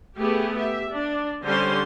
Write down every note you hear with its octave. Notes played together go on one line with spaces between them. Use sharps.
A3 B3 G4 G#4
G4 E5
D4
D3 G3 C#4 C5 C6